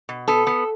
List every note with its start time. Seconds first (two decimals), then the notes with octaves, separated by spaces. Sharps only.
0.09 B2
0.28 B3 A4
0.47 B3